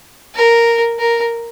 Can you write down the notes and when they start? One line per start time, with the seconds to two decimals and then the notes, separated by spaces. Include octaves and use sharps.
0.35 A#4
0.99 A#4